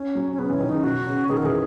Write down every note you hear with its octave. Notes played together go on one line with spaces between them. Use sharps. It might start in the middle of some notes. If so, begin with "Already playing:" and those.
Already playing: C#4
F#3
C#4
C#3 B3
E3
C#4
D#3
C#3 D#4
B2 F#4
C#3
D#3 G#4
A#4
E3 G#4